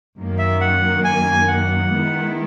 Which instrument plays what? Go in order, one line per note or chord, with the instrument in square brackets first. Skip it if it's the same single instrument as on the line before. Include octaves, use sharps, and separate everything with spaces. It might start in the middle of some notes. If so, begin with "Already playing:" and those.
[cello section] F#2 D#3 A#3
[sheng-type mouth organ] E5
F#5
G#5
F#5
[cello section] D#3 G#3 B3 E4